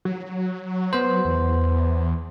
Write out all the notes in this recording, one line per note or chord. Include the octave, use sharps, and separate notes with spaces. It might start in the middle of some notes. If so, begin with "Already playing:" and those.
F#3
B3 C5
E2